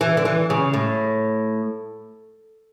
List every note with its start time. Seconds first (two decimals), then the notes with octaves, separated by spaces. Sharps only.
0.01 E3
0.17 D3
0.25 E3
0.50 C#3
0.74 A2